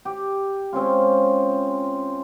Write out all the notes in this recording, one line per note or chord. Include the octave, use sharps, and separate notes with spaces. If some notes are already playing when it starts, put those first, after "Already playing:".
G4
G#3 C4 C#4 F4